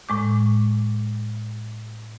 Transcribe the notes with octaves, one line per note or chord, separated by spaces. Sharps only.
A2 G#3 D6